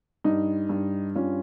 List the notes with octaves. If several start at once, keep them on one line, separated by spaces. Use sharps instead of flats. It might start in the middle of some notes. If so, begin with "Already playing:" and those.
G2 D#4
G2
G2 C#4 F4